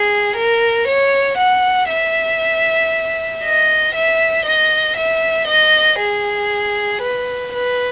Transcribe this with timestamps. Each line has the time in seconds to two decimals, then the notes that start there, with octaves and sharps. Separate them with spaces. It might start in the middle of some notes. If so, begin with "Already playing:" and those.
Already playing: G#4
0.37 A#4
0.88 C#5
1.38 F#5
1.90 E5
3.44 D#5
3.95 E5
4.46 D#5
4.97 E5
5.48 D#5
5.99 G#4
7.03 B4
7.53 B4